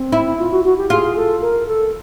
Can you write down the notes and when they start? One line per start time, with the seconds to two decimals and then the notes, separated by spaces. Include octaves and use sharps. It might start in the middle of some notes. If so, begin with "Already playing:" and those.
Already playing: C4
0.12 E4
0.39 F4
0.51 F#4
0.64 F#4
0.77 G4
0.90 F4 G#4
1.16 A4
1.41 A#4
1.67 A4